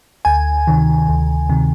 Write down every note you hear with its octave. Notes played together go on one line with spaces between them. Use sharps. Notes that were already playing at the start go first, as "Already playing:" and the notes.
D2 G#5
C3 D#3
D2
C3 D#3